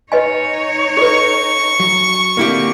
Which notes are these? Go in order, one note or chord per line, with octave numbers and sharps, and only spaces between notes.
D#4 B4 C#5 D#5 G#5
A4 B4 C#6
F#3
D3 A#3 C4 E4 G4